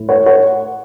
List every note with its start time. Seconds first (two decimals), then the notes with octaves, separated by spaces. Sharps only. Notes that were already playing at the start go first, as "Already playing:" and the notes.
Already playing: A2
0.09 C#5 F#5
0.26 C#5 F#5